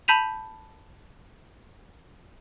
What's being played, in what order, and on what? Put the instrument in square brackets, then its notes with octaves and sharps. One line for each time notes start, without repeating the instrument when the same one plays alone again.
[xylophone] A5 B5 G6 B6 D#7 F7